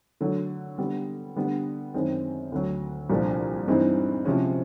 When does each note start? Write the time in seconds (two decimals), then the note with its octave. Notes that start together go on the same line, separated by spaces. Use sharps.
0.21 D3 F#3 A3
0.78 D3 G3 B3
1.36 D3 G3 B3 D4
1.94 F#2 D#3 G#3 C4
2.52 D2 D3 F#3
3.10 C2 A#2 F3 A3 D4
3.68 G2 E3 G#3 C4 D#4
4.25 C3 F3 G#3 C#4